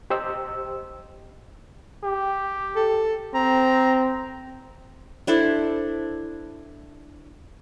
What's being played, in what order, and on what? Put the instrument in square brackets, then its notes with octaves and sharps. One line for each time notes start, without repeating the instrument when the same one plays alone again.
[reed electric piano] G4 C5 D#5 E6
[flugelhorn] G4
[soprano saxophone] A4
[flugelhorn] C4 [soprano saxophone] A#5
[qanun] D4 E4 A4 C5